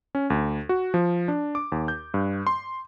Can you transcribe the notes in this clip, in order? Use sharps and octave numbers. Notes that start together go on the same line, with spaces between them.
C#4
D2
F#4
F3
D4
D6
D#2
G6
G2
C6